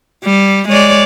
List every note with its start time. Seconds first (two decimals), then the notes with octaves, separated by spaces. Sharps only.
0.25 G3
0.69 G#3 C#5 D5